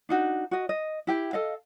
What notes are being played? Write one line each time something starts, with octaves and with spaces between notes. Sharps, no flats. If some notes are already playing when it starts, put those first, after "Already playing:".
D4 D#4 F#4
F#4 D#5
D#5
E4 G4 G5
A4 D#5 F5